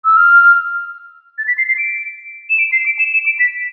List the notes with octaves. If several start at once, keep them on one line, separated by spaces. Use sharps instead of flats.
E6
F6
A6
B6
C7
C7
D7
E7
D7
C7
D7
E7
E7
D7
B6